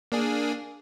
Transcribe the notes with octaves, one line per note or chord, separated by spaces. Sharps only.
A#3 D4 G#4